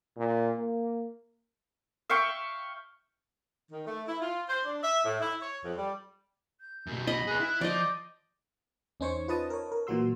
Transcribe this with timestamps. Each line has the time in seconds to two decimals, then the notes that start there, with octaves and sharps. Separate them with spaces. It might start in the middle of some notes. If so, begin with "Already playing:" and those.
0.17 A#2
0.57 A#3
2.10 E5 F5 G5 C#6
3.72 D#3
3.87 A3
4.08 E4
4.21 F4
4.49 C5
4.65 D4
4.83 E5
5.05 A2
5.21 E4
5.42 C#5
5.64 F2
5.78 G3
6.60 G6
6.87 F#2 B2
7.07 D#5 B5
7.27 G#4 B4 F#6
7.40 E4
7.61 F3 D5 D#5 G6
9.00 E2 C#4 D#4 C5 C#5 C#6
9.28 F4 B4 D#5 A5 D#6
9.50 A#4 C#5
9.72 A#4
9.87 A#2 E3 F#3 F#4 C6 E6